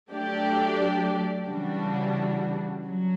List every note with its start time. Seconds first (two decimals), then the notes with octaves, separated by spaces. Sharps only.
0.10 F#3 A3 D4 G4 D5
1.47 C#3 E3 G3 D4 F#4
2.84 F#3